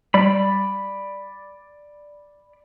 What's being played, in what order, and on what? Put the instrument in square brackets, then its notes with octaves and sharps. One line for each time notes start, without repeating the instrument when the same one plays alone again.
[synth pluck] G3 [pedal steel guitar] D5 B5